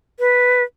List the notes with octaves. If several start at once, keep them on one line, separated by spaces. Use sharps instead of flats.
B4